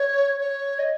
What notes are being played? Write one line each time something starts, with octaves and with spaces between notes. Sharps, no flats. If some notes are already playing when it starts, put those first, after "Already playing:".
Already playing: C#5
C#5
D#5